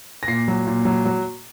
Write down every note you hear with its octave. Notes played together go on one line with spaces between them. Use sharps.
A#6
A#2 C7
F#3
A#2
F#3
F#3